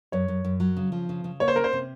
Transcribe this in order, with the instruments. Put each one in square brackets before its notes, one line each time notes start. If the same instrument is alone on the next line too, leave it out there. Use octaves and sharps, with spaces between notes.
[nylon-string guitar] F#2 [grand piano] C#5
[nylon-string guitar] F#2
F#2
F#3
C#3
F3
C#3
C#3
[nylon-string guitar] A#3 [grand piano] C#5
[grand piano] C5
[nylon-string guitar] C#4 [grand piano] A#4
[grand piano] C5
[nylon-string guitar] C3